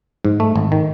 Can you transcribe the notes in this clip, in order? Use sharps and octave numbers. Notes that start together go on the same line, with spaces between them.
G#2
A3
G#1
D#3